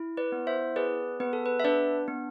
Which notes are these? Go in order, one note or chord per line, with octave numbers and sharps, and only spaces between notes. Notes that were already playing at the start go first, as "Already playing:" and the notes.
Already playing: E4
B4 D5
B3
C5 E5
G#4 B4 D5
B3 B4
A4
B4
E5
D4 B4 D5
B3